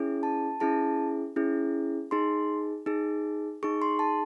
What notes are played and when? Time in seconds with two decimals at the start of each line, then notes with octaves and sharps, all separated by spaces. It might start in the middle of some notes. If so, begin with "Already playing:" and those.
Already playing: C#4 E4 G#4
0.23 A5
0.60 C#4 E4 G#4 A5
1.36 C#4 E4 G#4
2.11 D#4 G#4 C6
2.86 D#4 G#4
3.63 D#4 G#4 C#6
3.82 C6
3.99 A5